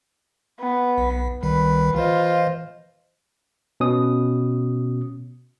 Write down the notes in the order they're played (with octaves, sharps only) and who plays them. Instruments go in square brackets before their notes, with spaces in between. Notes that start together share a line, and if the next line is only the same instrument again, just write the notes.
[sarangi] B3
[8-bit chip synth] B1
[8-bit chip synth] C2 D#3 G3 [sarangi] B4
[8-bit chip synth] E3 C5 D#5 [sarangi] F4
[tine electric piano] B2 C#4 D#6